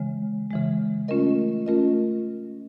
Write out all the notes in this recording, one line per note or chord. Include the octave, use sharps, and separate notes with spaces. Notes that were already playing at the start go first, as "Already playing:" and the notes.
Already playing: C#3 E3 G#3
C#3 E3 G#3
A3 C#4 F4 A#4 D#5
A3 C#4 F4 A#4 D#5